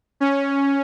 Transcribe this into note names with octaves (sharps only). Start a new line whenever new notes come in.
C#4